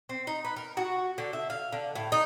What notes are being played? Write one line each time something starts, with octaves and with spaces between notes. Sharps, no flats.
C4
D#4
B4
A#4
F#4
D3
E5
F5
D3
A2
D#4